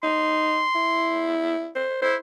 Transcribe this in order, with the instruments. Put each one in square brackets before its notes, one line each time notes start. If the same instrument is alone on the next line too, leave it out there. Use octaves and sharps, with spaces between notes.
[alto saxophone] D#4 [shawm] C6
[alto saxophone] E4
C5
[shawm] E4 [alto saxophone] C5